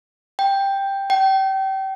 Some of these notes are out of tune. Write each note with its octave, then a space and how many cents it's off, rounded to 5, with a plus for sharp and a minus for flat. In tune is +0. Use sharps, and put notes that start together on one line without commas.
G5 +5
G5 -30